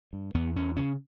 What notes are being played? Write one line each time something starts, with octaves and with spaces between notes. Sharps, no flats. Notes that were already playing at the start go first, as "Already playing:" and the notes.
G2
E2 B3
E2 C#4
C#3 C#4